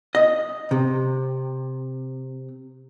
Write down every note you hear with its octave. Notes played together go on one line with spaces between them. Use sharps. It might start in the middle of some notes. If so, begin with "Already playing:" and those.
D#5
C3